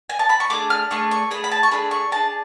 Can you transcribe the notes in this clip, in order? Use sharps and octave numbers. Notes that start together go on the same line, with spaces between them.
G#5
A5
B5
C#6
A3 D4 G#4 D6
F6
A3 D4 G#4 C#6
C#6
A3 D4 G#4 B5
B5
A5
C#6
A3 D4 G#4 B5
C#6
D4 G#4 A5